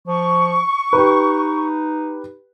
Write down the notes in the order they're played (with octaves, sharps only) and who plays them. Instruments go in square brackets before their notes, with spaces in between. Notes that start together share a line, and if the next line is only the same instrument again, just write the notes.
[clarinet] F3 [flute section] C#6
[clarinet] D#4 [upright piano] G4 B4